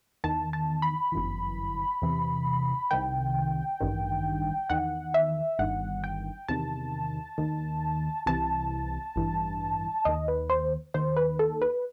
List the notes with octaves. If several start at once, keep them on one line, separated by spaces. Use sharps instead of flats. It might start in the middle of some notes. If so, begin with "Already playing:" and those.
E2 D#3 A5
A5
B5
G1 F#2 E3
E2 C3 E3
C2 C3 D#3 G5
A1 G2 D#3
E2 D#3 F#5
E5
G1 G2 D#3 F#5
G5
E2 C3 D#3 A5
D#2 D#3
C2 C3 E3 A5
A1 G2 E3
D#2 D#3 D#5
B4
C5
D#2 D#3 C5
B4
A4
B4